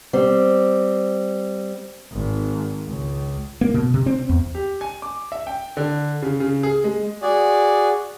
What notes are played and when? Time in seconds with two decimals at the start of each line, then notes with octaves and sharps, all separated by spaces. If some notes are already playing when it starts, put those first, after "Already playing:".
0.13 G3 C4
2.12 G#1
2.86 C#2
3.61 A#3
3.74 B2
3.94 C3
4.06 C4
4.29 E2
4.55 G4
4.81 G#5
5.02 D6
5.32 E5
5.47 G5
5.77 D3
6.22 C#3
6.40 C#3
6.63 G#4
6.84 G#3
7.22 F#4 G#4 D5